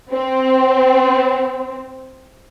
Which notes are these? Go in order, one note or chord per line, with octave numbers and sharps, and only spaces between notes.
C4